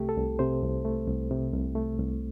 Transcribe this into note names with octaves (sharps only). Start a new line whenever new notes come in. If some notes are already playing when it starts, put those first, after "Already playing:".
Already playing: C2 C3 A3 G4
A4
C2
C3 C5
C2
A3
C2
C3
C2
A3
C2